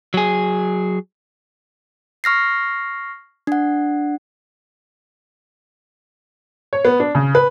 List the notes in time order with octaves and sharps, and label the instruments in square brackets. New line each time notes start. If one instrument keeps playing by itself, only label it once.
[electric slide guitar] F#3 G#4
[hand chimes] C#6 F6 A#6 C7
D4 F#5
[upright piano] C#5
B3
D4
C#3
B4